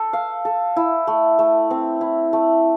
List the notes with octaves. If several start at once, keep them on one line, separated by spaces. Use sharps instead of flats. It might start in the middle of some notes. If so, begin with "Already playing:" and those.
Already playing: A4
F5
A4
E4
A3
A3
C4
E4
A3